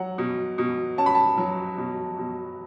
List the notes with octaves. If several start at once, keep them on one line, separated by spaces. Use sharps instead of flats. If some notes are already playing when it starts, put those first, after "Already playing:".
Already playing: F#3 F#5
B2
B2
C#4 A5
B5
A5
F#3
B2
B2